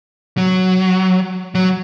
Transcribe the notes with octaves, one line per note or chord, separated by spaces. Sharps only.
F#3
F#3